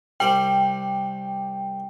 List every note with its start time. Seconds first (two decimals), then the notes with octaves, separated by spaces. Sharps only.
0.20 C2 G4 C5 G5